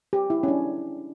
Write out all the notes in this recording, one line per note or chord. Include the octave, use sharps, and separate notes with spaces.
G4
E4
C#4
D4